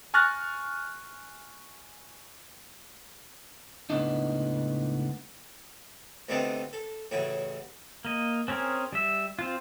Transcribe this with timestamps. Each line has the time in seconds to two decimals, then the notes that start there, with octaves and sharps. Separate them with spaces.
0.14 G#5 C#6 F6 F#6 A6 A#6
3.90 C#2 A2 B3 D4 D#4
6.29 D2 C3 B3 C4 D#4 A5
6.73 A4
7.11 A1 C#3 E4 F#4
8.05 A#3 D#5
8.48 C4 C#4 G#4 A#4
8.93 G3 E5
9.39 C4 F4